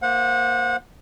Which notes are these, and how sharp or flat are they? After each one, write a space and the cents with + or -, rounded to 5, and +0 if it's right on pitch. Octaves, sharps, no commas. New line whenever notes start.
A#3 +0 C5 +0 F#5 -25